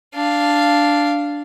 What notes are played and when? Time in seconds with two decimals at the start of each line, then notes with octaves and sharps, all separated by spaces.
0.14 D4 F5